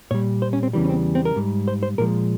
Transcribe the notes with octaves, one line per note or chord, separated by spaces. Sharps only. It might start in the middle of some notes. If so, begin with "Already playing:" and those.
A#2 G3 C#5
C5
C#4
C4
E2 C#3 E3 G3
C#4
C4
C4
A#4
G#2 G3
C5
C5
A#2 F3 G#3 A#4